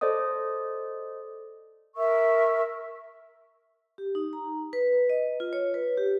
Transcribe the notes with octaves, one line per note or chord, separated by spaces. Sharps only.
A4 C5 D5 D#5 D#6
A#4 E5 C#6 E6
G4
D#4
A#5
B4
D#5
F4
C#5
B4
G4